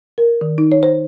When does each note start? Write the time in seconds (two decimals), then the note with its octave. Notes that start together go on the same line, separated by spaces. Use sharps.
0.18 A#4
0.41 D#3
0.58 D#4
0.72 C#5
0.83 C5